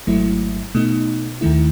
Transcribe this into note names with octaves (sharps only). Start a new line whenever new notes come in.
G#1 G#2 F#3 A3 E4
B2 A3 D#4
D#2 D#3 A3 E4